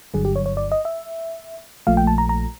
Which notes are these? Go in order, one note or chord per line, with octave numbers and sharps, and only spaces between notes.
G1 G2 D3 F#3 G#4
G4
C#5
C#5
D5
D#5
E5
A#1 A#2 F3 A3 F5
G5
A5
A#5
A#5